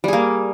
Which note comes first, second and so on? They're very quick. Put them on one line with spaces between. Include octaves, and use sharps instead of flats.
G3 G#4 A#3